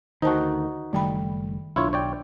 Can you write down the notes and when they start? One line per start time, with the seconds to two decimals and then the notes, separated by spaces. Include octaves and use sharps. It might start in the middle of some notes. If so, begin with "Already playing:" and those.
0.22 D2 D#3 D#4 F#4 C5 A5
0.93 F#1 D#3 G3 A3 G5 B5
1.76 B1 D4 E4 F4 C#5
1.93 C#5 D5 G5